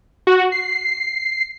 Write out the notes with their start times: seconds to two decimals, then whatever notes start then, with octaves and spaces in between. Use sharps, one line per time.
0.27 F#4
0.52 C7